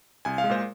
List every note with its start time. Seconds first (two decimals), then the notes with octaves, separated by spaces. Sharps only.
0.25 C2 G#5
0.38 F5
0.44 G#3
0.50 A#2 C5